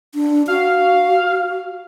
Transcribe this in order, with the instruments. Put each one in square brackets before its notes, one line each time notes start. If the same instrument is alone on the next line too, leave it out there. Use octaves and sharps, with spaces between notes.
[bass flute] D4
[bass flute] F#4 [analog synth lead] F5